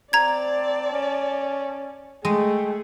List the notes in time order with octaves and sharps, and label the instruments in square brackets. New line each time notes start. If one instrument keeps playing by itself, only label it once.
[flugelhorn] C4 [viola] D5 A5 [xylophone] A#5 G#6
[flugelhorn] C#4
[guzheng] G#3 [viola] A3 G#4 [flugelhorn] G5